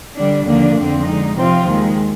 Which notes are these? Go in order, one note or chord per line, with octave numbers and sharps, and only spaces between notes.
D3 G3 D4
D#2 D3 F3 A#3 D4
F2 D3 F3 C4
D3 G#3 D#4
C3 F3 C4 F4
D#2 D#3 G#3